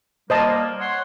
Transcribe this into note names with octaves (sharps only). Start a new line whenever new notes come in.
G3 A#3 C5 D#5 A5
C#5 F#5 C6